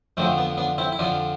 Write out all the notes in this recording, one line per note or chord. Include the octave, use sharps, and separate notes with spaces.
F2 D3 F3 A3 C4
B3
B3 D4
C4 E4
E4
F2 D3 F3 D4 F4